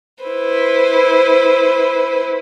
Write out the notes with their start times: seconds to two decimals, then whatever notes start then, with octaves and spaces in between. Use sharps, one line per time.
0.23 E4 B4 C5